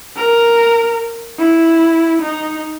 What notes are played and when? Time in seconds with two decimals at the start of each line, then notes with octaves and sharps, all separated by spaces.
0.17 A#4
1.39 E4
2.22 D#4